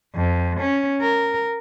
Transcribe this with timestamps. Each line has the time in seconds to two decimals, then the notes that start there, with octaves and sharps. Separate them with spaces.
0.15 F2
0.60 C#4
1.01 A#4